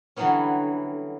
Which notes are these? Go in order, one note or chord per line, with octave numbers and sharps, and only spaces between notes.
D3 E3 F#3 G3 B3 C#4